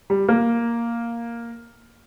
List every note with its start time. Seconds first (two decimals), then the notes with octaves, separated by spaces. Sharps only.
0.10 G3
0.29 A#3